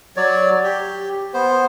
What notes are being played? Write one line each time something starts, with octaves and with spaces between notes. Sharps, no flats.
F#3 C#5 D5
G4
B3 C5